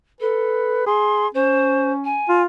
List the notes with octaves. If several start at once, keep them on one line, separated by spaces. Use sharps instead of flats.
A4 B4
G#4 C6
C#4 C5
G#5
F4